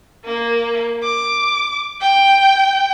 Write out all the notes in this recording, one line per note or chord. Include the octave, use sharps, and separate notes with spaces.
A#3
D6
G5